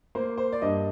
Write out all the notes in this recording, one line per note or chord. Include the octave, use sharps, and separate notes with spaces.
A#3 C5
C5
D5
G2 D#5